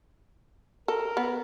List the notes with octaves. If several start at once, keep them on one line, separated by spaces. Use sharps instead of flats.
A4 A#4
B3